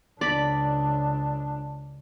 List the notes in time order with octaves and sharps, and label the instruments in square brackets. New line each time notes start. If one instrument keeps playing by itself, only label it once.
[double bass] C#2 D4 [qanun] D5 B5